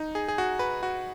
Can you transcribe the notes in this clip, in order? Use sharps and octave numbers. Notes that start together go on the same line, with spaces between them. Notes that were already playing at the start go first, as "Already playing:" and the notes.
Already playing: D#4
G#4
G#4
F#4
B4
F#4